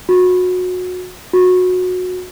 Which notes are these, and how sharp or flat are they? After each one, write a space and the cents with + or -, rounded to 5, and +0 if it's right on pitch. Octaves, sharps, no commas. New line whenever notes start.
F#4 -25
F#4 -20